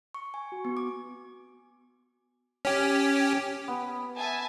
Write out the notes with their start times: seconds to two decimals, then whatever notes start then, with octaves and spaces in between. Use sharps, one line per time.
0.14 C#6
0.34 G#5
0.52 F#4
0.65 B3
0.77 D6
2.65 C#4 G4
3.68 B3
4.18 E5 G#5 A5